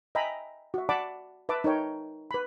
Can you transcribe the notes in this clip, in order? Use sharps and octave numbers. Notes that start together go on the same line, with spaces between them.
D#5 E5 G5 G#5 A#5 B5
F#4 E5
D5 F#5 A5 B5 D6
B4 E5 A5 D6
D#4 A#4 C#5 G5
B4 B5